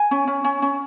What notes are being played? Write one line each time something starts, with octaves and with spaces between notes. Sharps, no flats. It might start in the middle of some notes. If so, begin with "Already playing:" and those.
Already playing: G#5
C#4
C#4
C#4
C#4